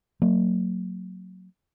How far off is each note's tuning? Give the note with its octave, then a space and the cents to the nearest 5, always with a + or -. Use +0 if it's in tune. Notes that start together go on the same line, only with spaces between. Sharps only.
F#3 +0 A#3 -30